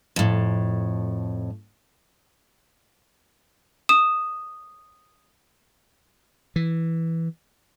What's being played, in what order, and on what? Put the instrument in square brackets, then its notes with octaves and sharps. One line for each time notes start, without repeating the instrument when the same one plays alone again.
[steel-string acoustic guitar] F2 A2
[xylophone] D#6 E7
[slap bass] E3